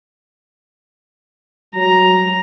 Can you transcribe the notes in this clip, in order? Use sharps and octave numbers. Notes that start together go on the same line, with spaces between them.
F#3 A#5